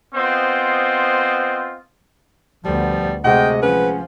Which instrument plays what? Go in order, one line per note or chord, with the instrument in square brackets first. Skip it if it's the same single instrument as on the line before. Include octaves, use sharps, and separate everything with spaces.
[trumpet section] B3 C4 F4 C5 D#5
[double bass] D2 B3 [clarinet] F3 [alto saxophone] G3
[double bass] C3 A3 [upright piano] G#3 F#4 F#5 [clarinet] D#5 [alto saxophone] G5
[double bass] F3 [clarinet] C#4 [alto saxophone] B4